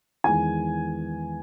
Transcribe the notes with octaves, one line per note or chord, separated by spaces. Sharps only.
E2 D#3 G#3 G#5